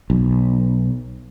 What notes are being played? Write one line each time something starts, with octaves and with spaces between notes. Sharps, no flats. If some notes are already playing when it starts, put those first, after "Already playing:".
B1